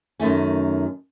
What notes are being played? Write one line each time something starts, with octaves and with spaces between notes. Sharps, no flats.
F#2 D#3 A3 C#4